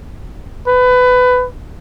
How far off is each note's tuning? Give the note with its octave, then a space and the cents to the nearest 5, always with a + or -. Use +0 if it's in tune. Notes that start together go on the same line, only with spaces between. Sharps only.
B4 +20